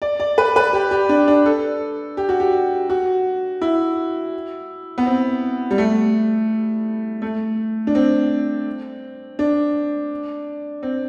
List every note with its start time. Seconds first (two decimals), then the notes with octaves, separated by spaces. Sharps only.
0.02 D5
0.20 D5
0.38 B4
0.56 B4
0.73 G4
0.91 G4
1.09 D4
1.28 D4
1.46 A4
2.17 G4
2.29 F#4
2.40 G4
2.90 F#4
3.62 E4
4.98 B3
5.06 C4
5.71 G3
5.78 A3
7.22 A3
7.87 D4
7.95 C4
9.39 D4
10.83 C4